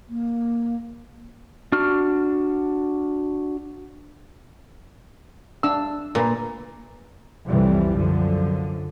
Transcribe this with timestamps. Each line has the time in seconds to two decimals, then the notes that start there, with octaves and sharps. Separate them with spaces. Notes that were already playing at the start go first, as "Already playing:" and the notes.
0.09 A#3
1.72 D4 F#4 F6
5.63 D4 F5 E6
6.15 A#2 A#3 A#4 B4
7.48 C2 F2 C3 E3 G3
7.96 F#2 D3 F3